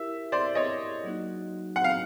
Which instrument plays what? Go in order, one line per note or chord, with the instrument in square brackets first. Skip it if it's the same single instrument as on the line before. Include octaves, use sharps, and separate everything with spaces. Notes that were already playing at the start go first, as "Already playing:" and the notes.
Already playing: [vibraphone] E4 G4 A#4 [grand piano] E5
[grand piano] C5 D5
C#5 D#5
[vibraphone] F#3 A#3 D#4 F#4
[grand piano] F#5
F5